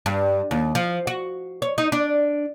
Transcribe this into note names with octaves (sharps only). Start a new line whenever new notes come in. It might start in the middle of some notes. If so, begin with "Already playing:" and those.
G2
D#2
F3
F#4
C#5
D#4
D4